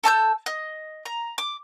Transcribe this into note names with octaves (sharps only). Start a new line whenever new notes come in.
A4 A5 E6 G6
D#5
A#5
D6